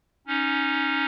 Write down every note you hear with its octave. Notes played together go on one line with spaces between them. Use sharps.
C#4 D#4